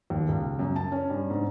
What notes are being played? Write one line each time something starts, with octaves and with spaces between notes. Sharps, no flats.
D#2
C#2
F#2
A5
C#4
G2
G#2